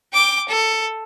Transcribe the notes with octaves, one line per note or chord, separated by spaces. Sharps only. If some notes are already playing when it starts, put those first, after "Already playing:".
G5 D6
A4